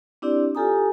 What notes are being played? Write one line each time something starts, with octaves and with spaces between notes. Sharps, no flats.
C4 D4 E4 G4 D5
F4 G4 A4 G#5 A#5 D#6